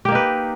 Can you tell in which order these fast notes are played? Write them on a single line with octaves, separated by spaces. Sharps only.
G4 A#3 D#4 B4